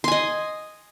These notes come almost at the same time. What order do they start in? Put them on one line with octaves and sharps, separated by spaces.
C6 G#5 D#5